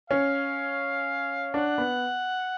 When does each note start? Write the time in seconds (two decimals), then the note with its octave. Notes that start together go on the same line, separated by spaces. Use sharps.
0.10 C#4 F5
1.54 D4 F#5
1.78 B3